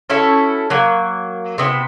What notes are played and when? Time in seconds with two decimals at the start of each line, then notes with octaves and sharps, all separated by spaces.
0.10 C#4 E4 F#4 A4
0.70 F#3 A#3
1.58 C3 B3 E4